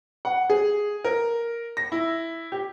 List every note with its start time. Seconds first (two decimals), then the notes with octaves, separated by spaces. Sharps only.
0.25 F#5
0.50 G#4
1.05 A#4
1.77 A#6
1.92 E4
2.52 G4